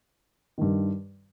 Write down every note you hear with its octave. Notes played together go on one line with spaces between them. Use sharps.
G2 D#3